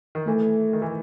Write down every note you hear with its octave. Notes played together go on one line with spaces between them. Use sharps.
D#3
E3 A3
D#3
E3